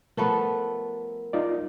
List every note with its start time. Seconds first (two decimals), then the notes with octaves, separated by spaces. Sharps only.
0.17 F3 G3 A3 B3 A#4
1.33 D#4 F4 D5